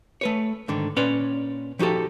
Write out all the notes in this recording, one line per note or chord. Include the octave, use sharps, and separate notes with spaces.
A3 B4 C#5
G#2 D3 D#3
A#2 C#4 B4 C#5 D5 C6
F3 D#4 F#4 G4 A4